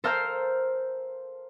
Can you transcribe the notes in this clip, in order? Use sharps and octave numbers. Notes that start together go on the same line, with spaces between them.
A4 A#4 C5 F5 F6 G6